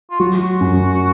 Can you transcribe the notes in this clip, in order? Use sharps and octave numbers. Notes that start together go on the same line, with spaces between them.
F4
F#3 F#4
F#2